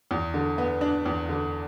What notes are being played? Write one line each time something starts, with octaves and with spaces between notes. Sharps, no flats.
E2
D3
B3
D4
E2
D3